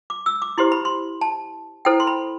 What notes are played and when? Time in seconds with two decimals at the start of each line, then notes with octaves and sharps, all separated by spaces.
0.10 D6
0.26 E6
0.42 D6
0.58 E4 G4 C5 C6
0.72 B5
0.85 C6
1.21 A5
1.85 E4 A4 C5 G5
2.00 C6
2.07 B5